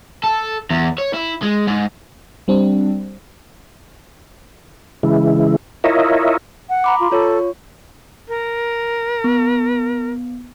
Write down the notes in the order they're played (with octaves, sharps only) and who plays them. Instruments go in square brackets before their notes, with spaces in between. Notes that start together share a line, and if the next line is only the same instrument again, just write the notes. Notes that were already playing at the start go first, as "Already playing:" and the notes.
[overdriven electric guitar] A4
E2
C#5
E4
G#3
G#2
[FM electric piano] G3 C4 D4
[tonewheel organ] C#3 E3 G#3 E4
E4 F4 A#4 C#5 D#5 E5
[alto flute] F#5
[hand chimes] A#5 B5 D6
[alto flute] F4
[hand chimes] F4 C#5 C#6 [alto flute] A4
[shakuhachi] A#4
[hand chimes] B3